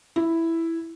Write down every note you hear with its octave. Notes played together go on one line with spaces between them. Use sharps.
E4